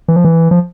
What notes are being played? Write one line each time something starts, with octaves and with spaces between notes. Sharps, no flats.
E3
F3
E3
F3